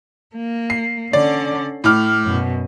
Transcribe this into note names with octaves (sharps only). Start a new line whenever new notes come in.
A#3
C7
D3 C#4 D5
A2 A3 D6 F6
F#2 B2